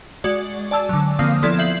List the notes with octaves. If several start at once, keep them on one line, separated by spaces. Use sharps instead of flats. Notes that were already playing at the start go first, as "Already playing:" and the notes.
G#3 F#4 D5
D5 G#5 A5 E6
D3 F#3
D3 F3 A#3 C4 F5 D#6
F3 B3 E4 A4 D5 G#6
E5 G6 C7 F#7